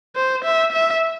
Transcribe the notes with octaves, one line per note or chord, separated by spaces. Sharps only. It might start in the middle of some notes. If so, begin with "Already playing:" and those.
C5
E5
E5